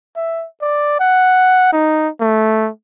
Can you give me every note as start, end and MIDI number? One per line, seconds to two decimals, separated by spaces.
0.16 0.46 76
0.61 0.95 74
1.00 1.70 78
1.73 2.08 63
2.20 2.69 57